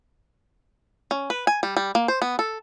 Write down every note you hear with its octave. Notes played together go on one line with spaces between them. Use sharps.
C#4
B4
G#5
G3
G3
A#3
C5
B3
A4